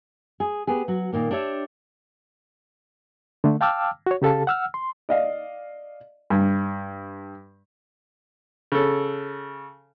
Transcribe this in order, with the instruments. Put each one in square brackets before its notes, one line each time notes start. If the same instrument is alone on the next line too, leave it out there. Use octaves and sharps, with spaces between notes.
[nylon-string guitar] G#4
B3 G4 G#4
F#3 F#4
A#2 D#3 A#3
D4 G4 C#5 E5
[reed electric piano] D3 A3
F5 G5 A5 D6 E6 F6
F#4 C#5
C#3 G4 A4 F5 A5
F#5 E6 F6
C6
[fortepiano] D5 D#5 F5
G2
C#3 A4